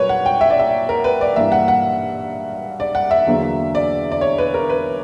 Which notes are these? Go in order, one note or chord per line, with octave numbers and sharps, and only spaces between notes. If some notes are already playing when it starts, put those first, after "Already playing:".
Already playing: A#2 F#3 A#3 A#4 B4 C#5
F#5
G5
E5
D5
E5
A#4
B4
D5
G2 E3 A#3 E5
F#5
F#5
D5
F#5
E5
E2 D3 F#3 A#3
D5
D5
C#5
B4
A#4
B4